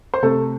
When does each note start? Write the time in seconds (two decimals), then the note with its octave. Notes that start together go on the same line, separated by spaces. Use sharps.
0.14 C5
0.23 C3 A3 A4